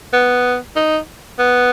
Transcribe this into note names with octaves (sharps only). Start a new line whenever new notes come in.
B3
D#4
B3